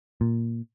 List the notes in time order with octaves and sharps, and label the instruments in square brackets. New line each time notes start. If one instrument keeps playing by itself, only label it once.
[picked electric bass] A#2